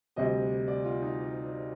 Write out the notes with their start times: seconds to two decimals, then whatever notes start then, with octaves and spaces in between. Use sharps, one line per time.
0.16 D2 C3 G3 D#5
0.68 D5
0.85 F4
1.02 D#4